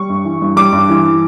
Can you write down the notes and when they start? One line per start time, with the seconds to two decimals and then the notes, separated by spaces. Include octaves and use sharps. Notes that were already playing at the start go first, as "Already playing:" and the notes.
Already playing: G3 C#6
0.10 G2
0.25 E3
0.42 G2
0.56 G3 D6
0.72 G2
0.89 E3